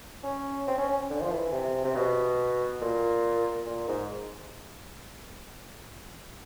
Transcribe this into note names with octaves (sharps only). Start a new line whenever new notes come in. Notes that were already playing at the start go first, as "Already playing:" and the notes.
C#4
C4
C#4
C#4
D3
F3
E3
C3
C3
B2
A#2
A#2
G#2